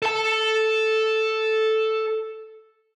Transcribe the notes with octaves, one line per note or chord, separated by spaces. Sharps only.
A4 A5